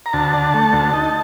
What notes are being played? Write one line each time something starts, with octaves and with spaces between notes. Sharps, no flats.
A#5
D2 A5
D3
A3
D2
D#4